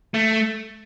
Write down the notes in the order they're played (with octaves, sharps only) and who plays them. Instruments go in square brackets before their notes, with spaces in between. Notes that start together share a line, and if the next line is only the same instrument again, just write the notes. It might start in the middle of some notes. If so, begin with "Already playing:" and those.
[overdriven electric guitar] A3